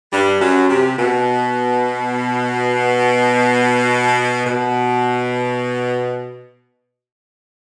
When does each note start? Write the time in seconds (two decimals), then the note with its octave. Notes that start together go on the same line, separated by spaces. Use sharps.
0.11 G2 G3
0.41 F#2 F#3
0.69 C3
0.98 B2
4.46 B2